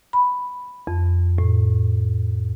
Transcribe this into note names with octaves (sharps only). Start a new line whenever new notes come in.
B5
F2
A2